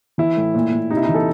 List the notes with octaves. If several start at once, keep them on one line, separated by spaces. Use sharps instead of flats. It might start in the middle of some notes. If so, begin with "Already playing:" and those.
E3 E4
A2
A#2
A#2
C3 D#4
E4
D#4
E3
A4